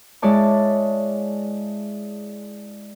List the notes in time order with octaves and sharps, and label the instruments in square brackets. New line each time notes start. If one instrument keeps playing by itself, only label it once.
[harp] G#3 E4 C#5 D5 A5